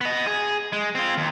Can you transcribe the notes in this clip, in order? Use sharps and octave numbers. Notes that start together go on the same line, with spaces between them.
B3 D#5
G#4
G#3
C4 F4
D#2